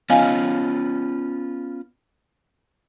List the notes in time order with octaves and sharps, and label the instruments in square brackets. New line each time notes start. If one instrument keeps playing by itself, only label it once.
[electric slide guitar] B3 C#4 F4 [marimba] D#5 F5 G#5